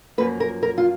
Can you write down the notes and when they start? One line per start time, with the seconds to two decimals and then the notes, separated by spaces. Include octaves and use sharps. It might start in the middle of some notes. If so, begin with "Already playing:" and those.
0.18 F#2 F3 A#3 B4
0.40 A#4
0.63 A#4
0.78 F4